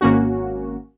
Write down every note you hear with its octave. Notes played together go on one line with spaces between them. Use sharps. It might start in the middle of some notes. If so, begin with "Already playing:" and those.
G#1 A#3 C#4 F#4